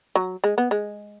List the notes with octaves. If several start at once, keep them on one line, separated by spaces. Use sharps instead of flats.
F#3
G#3
B3
G#3